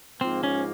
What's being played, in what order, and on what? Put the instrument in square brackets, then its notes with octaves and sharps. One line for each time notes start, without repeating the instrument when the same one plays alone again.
[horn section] G#2 F3 A#3 [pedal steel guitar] C4
[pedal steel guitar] C#4